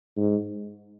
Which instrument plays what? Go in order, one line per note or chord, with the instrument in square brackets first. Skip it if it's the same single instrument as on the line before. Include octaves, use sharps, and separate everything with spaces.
[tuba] G#2